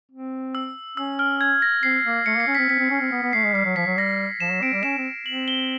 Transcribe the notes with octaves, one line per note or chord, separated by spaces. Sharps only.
C4
E6
C#4 E6
F6
G#6
A#6
C4 C7
A#3
A3 C#7
A#3
C7
C#4
C4 B6
C4 B6
C4
C#4
C4
B3
B3
A3 C7
G#3
G3 C7
F#3
F3 B6
F#3
G3 A#6
F3 E7
F#3
C4 D7
G3
C#4 E7
C4
C4 F#7
G7